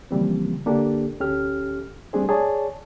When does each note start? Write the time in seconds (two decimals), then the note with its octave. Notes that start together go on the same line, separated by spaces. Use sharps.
0.11 C#3 E3 F3 G3 A#3 C4
0.66 D3 A#3 D4 G4 A4
1.20 D2 C#4 G4 A4 F6
2.13 G3 A3 C4 D4 G#4 C5
2.29 G#4 C#5 D5 A5